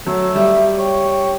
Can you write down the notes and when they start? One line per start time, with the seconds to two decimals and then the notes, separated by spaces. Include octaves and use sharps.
0.06 F#3 A3
0.35 G3 E5
0.78 C#5 G5